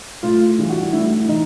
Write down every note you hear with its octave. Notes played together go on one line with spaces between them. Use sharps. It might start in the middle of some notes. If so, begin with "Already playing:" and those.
A2 F4
E3 G3
F#4
A2 E4
E3 D#4